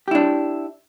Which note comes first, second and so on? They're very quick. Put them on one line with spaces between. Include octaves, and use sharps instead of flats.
G4 E4 D4